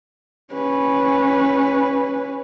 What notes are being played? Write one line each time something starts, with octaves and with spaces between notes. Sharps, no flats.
C#4 B4